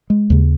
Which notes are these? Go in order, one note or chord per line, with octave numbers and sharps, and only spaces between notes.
G#3
D#2 C#3